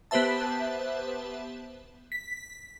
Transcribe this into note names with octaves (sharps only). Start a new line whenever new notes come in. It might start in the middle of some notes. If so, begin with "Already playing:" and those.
B3 G4 B4 C5 E5 A5
B6